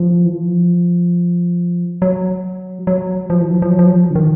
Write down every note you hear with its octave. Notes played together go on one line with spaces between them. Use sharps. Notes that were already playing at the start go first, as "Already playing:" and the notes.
Already playing: F3
E3
F3
F#3
F#3
F3
E3
F3
F3
F#3
F3
F#3
F3
D3
D#3